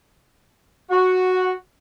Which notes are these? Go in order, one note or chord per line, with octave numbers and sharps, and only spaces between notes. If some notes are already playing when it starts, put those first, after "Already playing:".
F#4